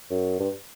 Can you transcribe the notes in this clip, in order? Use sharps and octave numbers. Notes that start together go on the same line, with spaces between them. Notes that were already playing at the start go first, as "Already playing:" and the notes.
F#2
G2